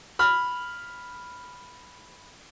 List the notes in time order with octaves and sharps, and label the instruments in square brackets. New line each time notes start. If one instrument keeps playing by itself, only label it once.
[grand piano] B5 F6